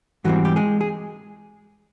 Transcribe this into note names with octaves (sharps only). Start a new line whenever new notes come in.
G#2 E3 F#3 G3 C4 F#4
G4
G#3 G#4
G#4